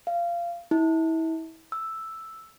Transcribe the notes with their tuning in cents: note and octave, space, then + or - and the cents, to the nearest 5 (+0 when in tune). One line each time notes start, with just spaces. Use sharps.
F5 -20
E4 -30
E6 +0